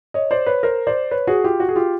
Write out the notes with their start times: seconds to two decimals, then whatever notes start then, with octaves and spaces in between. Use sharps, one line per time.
0.14 C#5 D#5
0.31 C5 D5
0.46 B4 C#5
0.63 A#4 C5
0.87 C5 D5
1.11 B4 C#5
1.27 F#4 G#4
1.44 F4 G4
1.60 F#4
1.69 G#4
1.76 F4 G4